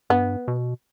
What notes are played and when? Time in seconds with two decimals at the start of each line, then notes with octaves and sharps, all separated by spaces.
0.10 G2 B3
0.48 B2